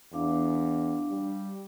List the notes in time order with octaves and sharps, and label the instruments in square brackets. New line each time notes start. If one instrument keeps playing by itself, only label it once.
[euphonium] E2 [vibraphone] D4 F5 D6
[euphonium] G3